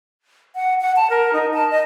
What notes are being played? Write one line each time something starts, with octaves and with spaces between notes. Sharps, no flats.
F#5
F#5
A5
A#4
D#4
A5
D#5